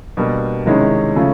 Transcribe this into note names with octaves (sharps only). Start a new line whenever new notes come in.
B2 G3 A#3 D4
C3 D#3 G#3 C#4 E4
C#3 F3 A3 C#4